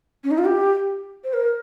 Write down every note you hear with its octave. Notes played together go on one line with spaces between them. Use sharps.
C#4
D#4
F4
G4
C5
A#4